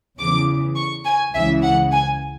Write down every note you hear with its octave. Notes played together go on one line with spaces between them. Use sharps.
E2 C#3 E3 D6
C#6
G#5
C#2 C#3 E3 E5
F#5
G#5